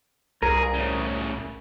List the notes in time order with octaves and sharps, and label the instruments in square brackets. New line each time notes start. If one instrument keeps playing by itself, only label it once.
[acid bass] C2 [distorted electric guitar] G#4 [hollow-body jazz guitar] A#4
[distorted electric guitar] A2 C#3